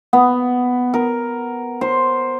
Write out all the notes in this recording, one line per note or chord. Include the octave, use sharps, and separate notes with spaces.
B3
A#4
C5